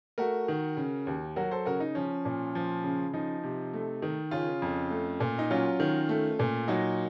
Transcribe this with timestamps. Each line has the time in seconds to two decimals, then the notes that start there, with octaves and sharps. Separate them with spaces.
0.18 A3 F#4 A#4
0.48 D#3
0.77 C#3
1.07 D#2
1.36 F#3 F#4 A#4
1.51 A4 C5
1.65 C#3 F#4 A#4
1.80 D#4
1.95 F3 C#4
2.25 A#2
2.55 F3
2.84 C#3
3.14 F3 D#4
3.44 C3
3.73 A3
4.02 D#3
4.31 C#3 C#4 F4
4.62 F2
4.91 A3
5.20 A#2
5.39 D#4
5.50 F#3 C#4 F4
5.80 D#3
6.09 A3
6.39 A#2
6.68 F#3 D#4 F#4